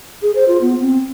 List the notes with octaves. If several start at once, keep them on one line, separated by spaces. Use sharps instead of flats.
G#4
C5
F4
B3
C4